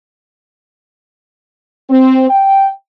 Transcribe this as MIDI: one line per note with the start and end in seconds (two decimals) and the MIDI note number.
1.90 2.26 60
2.30 2.68 79